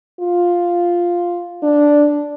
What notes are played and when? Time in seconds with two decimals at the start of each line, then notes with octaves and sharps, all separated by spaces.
0.20 F4
1.63 D4